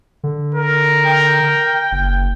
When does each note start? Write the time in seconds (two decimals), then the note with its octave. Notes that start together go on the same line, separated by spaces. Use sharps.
0.24 D3
0.55 A#4
1.06 G5
1.92 F#1